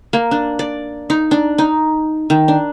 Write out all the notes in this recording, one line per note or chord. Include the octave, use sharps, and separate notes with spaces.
A#3
D4
D5
D#4
D4
D#4
D#3
D4